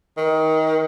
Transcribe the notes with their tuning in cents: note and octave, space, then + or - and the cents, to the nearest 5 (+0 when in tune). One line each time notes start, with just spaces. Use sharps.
D#3 +25